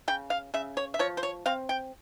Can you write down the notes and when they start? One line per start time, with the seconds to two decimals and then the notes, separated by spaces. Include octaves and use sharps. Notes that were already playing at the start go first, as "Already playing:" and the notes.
0.08 C#3 G5
0.30 F5
0.54 C#3 E5
0.77 C#5
0.94 E5
0.99 F3 C#5
1.17 C5
1.23 C#5
1.46 C4 F5
1.69 G5